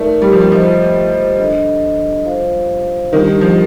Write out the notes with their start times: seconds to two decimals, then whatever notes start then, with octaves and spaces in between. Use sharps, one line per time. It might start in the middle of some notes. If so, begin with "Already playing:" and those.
Already playing: A3 D#4 A#4 D5
0.22 G3
0.32 F3
0.41 G3
0.51 F3 F4 C5 D#5
1.39 D4 A4 D#5
2.26 F4 C5 F5
3.13 D#3 G3 D4 G4
3.41 F3